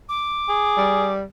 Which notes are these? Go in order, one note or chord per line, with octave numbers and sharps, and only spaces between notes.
D6
G#4
G3